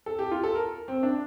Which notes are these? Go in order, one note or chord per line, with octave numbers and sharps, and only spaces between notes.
A4
G4
F4
A4
A#4
C4
D4